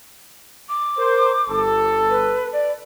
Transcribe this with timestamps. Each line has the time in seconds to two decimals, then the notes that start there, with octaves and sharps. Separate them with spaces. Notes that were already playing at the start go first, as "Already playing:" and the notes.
0.69 D6
0.98 A#4 C5
1.49 G1 A4
2.09 B4
2.52 D5